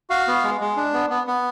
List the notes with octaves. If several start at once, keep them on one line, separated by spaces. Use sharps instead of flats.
F#4 F5
B3
G#3
G#3
D4
B3
B3
B3